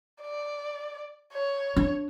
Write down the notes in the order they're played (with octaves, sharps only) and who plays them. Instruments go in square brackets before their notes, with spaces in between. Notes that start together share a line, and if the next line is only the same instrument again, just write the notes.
[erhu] D5
C#5
[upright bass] D4